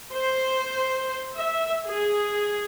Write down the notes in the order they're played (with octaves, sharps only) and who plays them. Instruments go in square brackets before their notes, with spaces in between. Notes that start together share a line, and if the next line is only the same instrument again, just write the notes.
[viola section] C5
E5
G#4